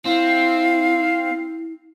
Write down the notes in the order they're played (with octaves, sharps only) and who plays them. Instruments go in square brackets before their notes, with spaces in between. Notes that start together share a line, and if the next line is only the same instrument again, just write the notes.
[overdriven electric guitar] C4 [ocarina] E4 [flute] F5